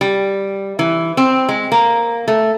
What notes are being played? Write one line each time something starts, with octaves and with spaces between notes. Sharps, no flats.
G3
E3
C4
G#3
A#3
A3